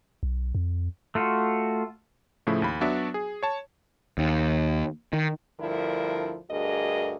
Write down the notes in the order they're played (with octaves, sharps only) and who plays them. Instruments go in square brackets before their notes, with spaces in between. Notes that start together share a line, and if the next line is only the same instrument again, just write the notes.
[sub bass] B1
F2
[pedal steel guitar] A3 F4 F#4
[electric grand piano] A2 C#3 F3 A3 E4
D#2 B5
F#3 B3 D4 F#4 D5 E5
G#4
C#5 A5
[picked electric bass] D#2
D#3
[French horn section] D2 G2 D3 F3 E4 A#4
D2 G2 F#4 G#4 A#4 D#5